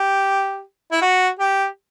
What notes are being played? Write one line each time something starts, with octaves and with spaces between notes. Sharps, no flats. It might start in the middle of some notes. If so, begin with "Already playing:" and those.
Already playing: G4
E4
F#4
G4